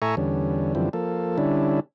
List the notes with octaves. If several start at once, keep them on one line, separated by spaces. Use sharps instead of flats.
A2 A4 E5 G#5 A#5 C#6
E2 D3 G3 C#4
F#2 D3 E3 F3 G3 C4
F3 A#3 A4
D3 G3 C#4 D4 E4